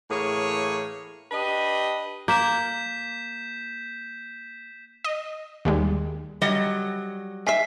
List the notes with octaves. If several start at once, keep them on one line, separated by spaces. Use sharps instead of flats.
A2 E3 A#3 G#4 C#5
D4 G4 B4 D#5
A#3 G6 B6 E7
D#5
D#2 G3 G#3
F#3 G3 D#5
D#3 E5 G#5 B6 C7